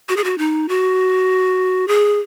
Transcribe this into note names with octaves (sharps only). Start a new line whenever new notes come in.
F#4
G#4
F#4
D#4
F#4
G#4